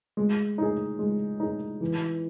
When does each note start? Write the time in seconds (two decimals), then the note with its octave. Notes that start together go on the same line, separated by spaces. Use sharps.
0.17 G#3
0.58 D#4 G#4
0.99 G#3
1.40 D#4 G#4
1.81 E3